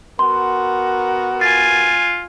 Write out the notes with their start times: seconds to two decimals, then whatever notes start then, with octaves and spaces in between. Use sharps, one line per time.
0.19 B3 F#4 A#4 C6
1.41 F4 G#5 A6